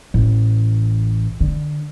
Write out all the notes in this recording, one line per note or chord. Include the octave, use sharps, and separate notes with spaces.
A1
D3